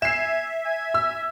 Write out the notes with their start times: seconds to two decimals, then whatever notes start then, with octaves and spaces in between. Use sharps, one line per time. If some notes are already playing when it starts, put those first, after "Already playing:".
0.02 E5 G#5 C7 E7
0.66 G#5
0.94 E6